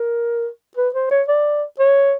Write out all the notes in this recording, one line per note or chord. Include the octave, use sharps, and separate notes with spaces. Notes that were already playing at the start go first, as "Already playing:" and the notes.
Already playing: A#4
B4
C5
C#5
D5
C#5